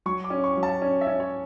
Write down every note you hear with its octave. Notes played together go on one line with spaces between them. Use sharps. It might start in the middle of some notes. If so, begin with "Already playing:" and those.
F#3 C#6
D6
C#4
C#6
F#3
A5
C#4
E5
C#4
C#5